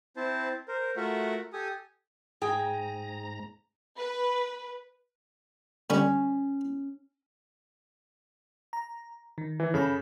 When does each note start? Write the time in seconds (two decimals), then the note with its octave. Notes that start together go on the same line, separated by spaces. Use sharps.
0.17 C4 E4 C5 A5
0.68 A#4 C5
0.97 A3 F4 F#4 A#4 E5 F#5
1.53 G4 A4 G#5 D#6
2.42 G#2 G#4 G5 A#5
3.99 B4
5.90 D3 G3 C#4
8.73 A#5
9.38 D#3
9.60 E3
9.74 F#2 C#3 A4 B5